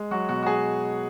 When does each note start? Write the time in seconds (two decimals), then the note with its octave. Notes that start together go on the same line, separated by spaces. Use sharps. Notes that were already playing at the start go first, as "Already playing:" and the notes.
Already playing: G#3
0.11 F#3 F#4
0.29 B2 F#4
0.43 F#4
0.46 B2 G#4